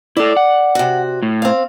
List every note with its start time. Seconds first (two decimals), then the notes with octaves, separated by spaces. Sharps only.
0.17 E4 A4 D5
0.37 F#5
0.75 C3 F#4
1.22 A2
1.42 C4 F5